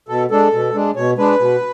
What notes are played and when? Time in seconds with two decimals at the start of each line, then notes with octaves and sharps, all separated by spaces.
0.08 B2 A4
0.31 G#3 D4 A4
0.53 B2
0.74 G#3 D4
0.96 B2 C#5
1.17 G#3 D4 B4
1.39 B2